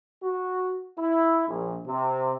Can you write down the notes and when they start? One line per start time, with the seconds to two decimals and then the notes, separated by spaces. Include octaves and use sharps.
0.22 F#4
0.97 E4
1.47 A#1
1.86 C3